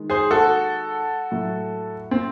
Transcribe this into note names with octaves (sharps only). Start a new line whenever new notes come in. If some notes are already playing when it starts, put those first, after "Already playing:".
Already playing: D#3 G#3
G#4 C5
F#4 A4
A2 F#3 A3
C4